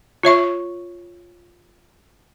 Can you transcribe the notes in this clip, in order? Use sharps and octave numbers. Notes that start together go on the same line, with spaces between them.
F4 C#5 E5 C#6